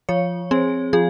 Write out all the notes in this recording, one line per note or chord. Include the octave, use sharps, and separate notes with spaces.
F3 C#5
C4 G#4
F3 G#4